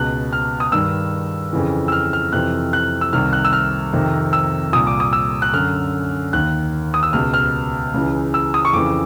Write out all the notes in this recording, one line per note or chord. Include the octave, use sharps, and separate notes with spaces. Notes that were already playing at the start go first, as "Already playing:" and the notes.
Already playing: C#2 B2 F#6
F6
D#6
G2 D#3 E6
F2 C#3 E3
E6
F6
F6
F2 C3 E3 F#6
F#6
E6
C2 C3 D#3 F6
F#6
E6
F6
F2 C3 D#3
E6
C2 A#2 D#6
D6
D#6
E6
F#6
F#2 D3 F6
D#2 D#3 F#6
D#6
E6
C#2 B2 F6
F6
C#2 C#3 E3
E6
D#6
C#6
F2 C#3 E3 D6